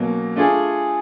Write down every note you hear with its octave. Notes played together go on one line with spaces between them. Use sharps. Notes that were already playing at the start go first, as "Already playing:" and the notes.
Already playing: B2 F#3 A#3 C#4
A3 D4 F4 G#4